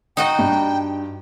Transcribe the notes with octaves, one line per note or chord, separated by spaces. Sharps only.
D#4 F#4 D#5 G5
G2